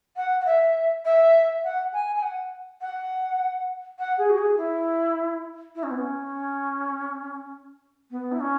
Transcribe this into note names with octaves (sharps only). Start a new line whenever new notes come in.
F#5
F#5
E5
E5
F#5
G#5
G#5
F#5
F#5
F#5
G#4
F#4
G#4
E4
E4
C#4
B3
C#4
B3
E4
C#4